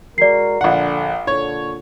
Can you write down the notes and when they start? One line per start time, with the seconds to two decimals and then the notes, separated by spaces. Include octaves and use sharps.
0.18 G#3 F#4 A#4 D5 C7
0.61 A#1 D3 F#5
1.27 A#2 D3 C#5